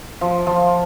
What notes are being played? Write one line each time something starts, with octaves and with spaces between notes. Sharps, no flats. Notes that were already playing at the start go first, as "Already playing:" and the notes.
F3
F3